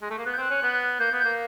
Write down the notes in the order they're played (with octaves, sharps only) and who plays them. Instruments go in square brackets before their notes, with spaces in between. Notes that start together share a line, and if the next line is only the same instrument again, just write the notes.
[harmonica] G#3
A3
A#3
[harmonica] B3 [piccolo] F#6
[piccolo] G6
[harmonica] C4 [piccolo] F#6
[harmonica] C#4
B3
[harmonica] A#3 [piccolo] G6
[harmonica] B3
[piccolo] G6
[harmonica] A#3